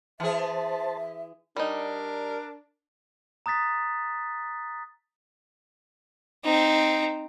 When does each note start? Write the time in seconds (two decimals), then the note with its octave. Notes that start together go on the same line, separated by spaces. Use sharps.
0.20 E3 G#4 C5 E5 A5
1.57 G3 D4 D#4 A#4
3.46 A#5 D#6 F#6 A6 B6
6.45 C4 D#4